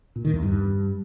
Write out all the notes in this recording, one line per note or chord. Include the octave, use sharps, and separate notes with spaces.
A#2
D#3
E2
G2